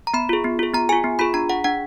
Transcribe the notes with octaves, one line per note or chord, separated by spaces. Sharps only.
A#5
B3 B5
F4 G#4
B3
F4 G#4
B3 A#5
F4 G#4 G#5
B3
F4 G#4 B5
D4 A#5
G#4 F#5
D4 F#5